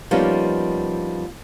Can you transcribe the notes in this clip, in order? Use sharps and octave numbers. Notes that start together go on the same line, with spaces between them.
F3 G3 A#3 B3 C#4 D#4